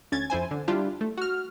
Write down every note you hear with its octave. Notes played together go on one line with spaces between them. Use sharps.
D2 C#4 G#6 A6
F2 E4 C5 G#5
D3
G3 D4 E4 F4 G4
A3
F#4 F6